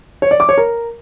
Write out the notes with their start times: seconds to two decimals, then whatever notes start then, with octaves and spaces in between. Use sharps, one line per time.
0.22 C#5
0.31 D5
0.40 D6
0.49 C#5
0.58 A#4